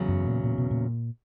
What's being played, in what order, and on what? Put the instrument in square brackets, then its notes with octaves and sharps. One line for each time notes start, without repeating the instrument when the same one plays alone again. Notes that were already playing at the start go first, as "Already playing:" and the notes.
Already playing: [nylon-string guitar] E2 C#3 F#3
[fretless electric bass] F#2
A#2
A#2
B2
A#2